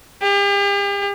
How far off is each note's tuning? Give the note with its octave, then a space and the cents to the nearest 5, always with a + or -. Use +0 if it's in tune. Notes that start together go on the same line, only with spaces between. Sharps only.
G4 +40